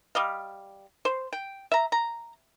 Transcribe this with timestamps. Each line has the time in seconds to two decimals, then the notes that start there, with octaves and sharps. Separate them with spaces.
0.15 G3 D#5 F5
1.05 C5
1.33 G5
1.72 E5 A#5
1.92 A#5